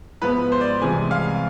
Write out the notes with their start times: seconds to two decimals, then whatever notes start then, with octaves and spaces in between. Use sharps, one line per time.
0.21 G#2 F3 B3 E4 B4
0.52 C5
0.61 D5
0.81 C2 C3 E3 G#3 G#5
1.11 F5